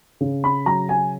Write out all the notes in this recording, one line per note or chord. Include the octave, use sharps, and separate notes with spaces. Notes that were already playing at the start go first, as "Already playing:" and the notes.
C#3
B5
F#3 A#5
G#5